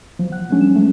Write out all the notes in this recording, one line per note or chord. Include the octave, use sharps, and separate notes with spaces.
F3 F#3
F#5 F#6
F#3 G3 A3 C#4 D4
E7
F#3 G#3 A3 C#4